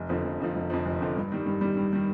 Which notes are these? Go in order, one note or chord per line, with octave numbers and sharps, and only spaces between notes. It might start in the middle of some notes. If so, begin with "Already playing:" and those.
Already playing: F1
F2 D3 F3
F1
F2 D3 F3
F1
F2 D3 F3
F1
F2 D3 F3
G2
D#3 G3
G2
D#3 G3
G2
D#3 G3